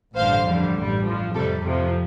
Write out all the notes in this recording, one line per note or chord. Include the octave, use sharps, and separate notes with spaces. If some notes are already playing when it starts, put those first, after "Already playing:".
A1 G2 D3 C5 F5
F2 D3 G3
A1 G2 G3
F2 F3
F2 C3 G3 A4
F2 C3 F3